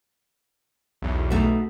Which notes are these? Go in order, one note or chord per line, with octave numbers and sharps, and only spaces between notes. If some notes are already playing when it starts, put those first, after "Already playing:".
B1 E2
B2 A3 D#4